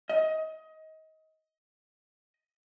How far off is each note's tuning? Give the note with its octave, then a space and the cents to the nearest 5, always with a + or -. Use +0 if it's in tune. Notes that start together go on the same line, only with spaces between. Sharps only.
D#5 +25